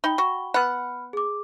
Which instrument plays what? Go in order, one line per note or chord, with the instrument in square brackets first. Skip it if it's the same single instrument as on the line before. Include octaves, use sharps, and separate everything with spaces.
[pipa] D#4 [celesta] G5 B5 G7
[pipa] F#4
[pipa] B3 F#5 [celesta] B5 F6
[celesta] G#4 D6